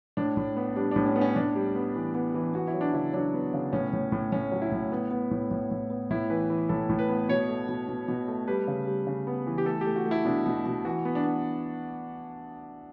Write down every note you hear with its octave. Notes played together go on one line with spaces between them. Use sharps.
A2 D4
A2
B3
G3 D4
A2 D4
C#4
B3
C#4
A2 D4
G3
B3
E3
B3
E3
B3 F#4
E4
F#3
D4
C#3 E4
F#3 D4
B3
C#3
A2 C#4
A2
A2
A2 C#4
F#3
E4
A2
B3
B3
A2
A2
A2
B3
A2 E4
E3 B4
E3
A2 A4
A2
B4
B3
B2 C#5
A3
B2
B2
B2
A3
G3 B4
C#3
G3
C#3
B3
E3
G4
A3 A4
G4
A3
F#4
A3
E4
B2 D4
B2
B2
E3 F#4
B3
D4
B3